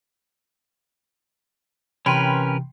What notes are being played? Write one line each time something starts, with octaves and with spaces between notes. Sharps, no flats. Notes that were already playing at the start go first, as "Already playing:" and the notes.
C3 E3 C#4 A#4 B4 G5 B5 C6